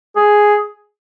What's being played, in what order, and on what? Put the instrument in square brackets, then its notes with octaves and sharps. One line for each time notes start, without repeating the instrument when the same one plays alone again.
[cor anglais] G#4